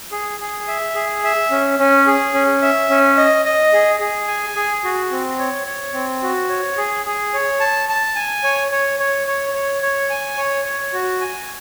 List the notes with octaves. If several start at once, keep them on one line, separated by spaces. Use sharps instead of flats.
G#4
G#4
E5
G#4
E5
C#4
C#4
G#4
C#4
E5
C#4
D#5
D#5
G#4
G#4
G#5
G#4
F#4
C4
C#5
C#5
C4
F#4
C#5
G#4
G#4
C#5
A5
A5
G#5
C#5
C#5
C#5
C#5
C#5
C#5
G#5
C#5
C#5
F#4
G#5